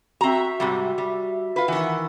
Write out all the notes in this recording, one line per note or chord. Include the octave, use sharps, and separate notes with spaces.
C4 F#4 E5 A#5
G#2 C3 G3
G3
F4 B4
D#3 E3 F#5